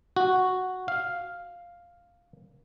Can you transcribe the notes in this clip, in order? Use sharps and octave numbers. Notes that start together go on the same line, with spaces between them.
F#4
F5